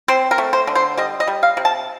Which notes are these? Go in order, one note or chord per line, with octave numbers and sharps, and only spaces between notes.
C4 C5
A#4
A3
C5
D3
C5
G3 D#5
D#5
G3
F5
C3
A5